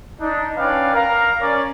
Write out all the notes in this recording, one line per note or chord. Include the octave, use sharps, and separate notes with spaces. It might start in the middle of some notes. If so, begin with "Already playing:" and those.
D4 D#4
C#4 D4 B4 D5 F5 G5
A#4 F5 A#5
C#4 A#4 D5